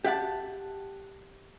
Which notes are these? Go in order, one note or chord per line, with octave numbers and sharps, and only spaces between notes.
G4 E5 F#5 A5